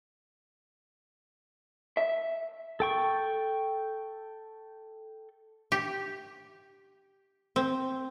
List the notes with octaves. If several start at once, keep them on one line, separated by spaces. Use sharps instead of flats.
E5
A4 G5 C#6
G4
C4